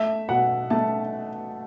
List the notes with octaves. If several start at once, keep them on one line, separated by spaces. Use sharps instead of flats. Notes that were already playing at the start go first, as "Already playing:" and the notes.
Already playing: A3 E5
B2 F#5
A3 A5